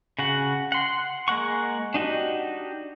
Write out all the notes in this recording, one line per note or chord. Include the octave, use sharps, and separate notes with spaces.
C#3 F#4 F#5
F#5 C6
G#3 A#3 F#5 C#6
D4 D#4 F#4 G4